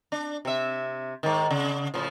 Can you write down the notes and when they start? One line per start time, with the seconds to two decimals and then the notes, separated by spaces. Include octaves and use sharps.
0.12 D4
0.45 C3 E5
1.23 G#2 D#3
1.51 C#3
1.94 A2 C#3 F3